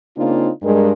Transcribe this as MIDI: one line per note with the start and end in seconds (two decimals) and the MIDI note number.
0.16 0.49 49
0.16 0.49 58
0.16 0.49 60
0.16 0.49 62
0.16 0.49 63
0.16 0.49 65
0.62 0.93 43
0.62 0.93 56
0.62 0.93 70